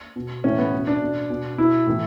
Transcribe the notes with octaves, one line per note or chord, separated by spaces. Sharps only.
B2
A2 E3 C#4
B3
B2
D4
B2
B2
B2 E4
A2 E3